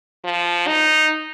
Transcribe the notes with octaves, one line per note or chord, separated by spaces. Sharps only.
F3
D#4